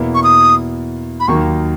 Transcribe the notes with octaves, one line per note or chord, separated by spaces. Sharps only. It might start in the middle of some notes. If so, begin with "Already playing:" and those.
Already playing: E2 B2 A#3 E4
C#6
D#6
B5
D#2 D#3 F#3 A#3 D#4 C#6